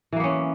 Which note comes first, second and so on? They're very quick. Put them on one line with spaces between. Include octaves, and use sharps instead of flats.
E3 A#3 B3 C#4